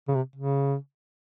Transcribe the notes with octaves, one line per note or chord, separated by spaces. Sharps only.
C#3
C3
C#3